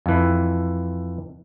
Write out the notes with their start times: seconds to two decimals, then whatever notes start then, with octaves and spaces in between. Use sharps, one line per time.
0.06 F2 E3